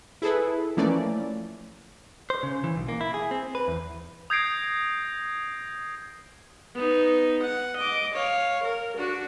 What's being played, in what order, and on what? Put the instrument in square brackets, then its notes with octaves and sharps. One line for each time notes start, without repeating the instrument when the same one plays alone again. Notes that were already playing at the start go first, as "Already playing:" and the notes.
[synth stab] E4 G#4 A4 B4
E3 F3 A3 A#3 C#4 D5
[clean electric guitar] C5
C#3
E3
B1
A#3
E4
G#4
C4
B4
E2
[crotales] D#6 G6 G#6 A#6 C7 D7
[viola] B3 D#4
F#5
D#5 D6
C#5 F5
A#4
D4 F#4